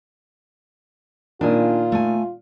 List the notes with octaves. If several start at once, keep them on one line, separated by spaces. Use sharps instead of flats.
A#2 D#3 D4 F4 G#5
A3 G#5